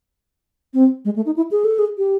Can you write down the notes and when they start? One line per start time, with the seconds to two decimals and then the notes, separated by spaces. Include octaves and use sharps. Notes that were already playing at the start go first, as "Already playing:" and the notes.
0.74 C4
1.05 G#3
1.16 A3
1.26 D#4
1.37 E4
1.51 G#4
1.65 A4
1.79 G#4
1.98 G4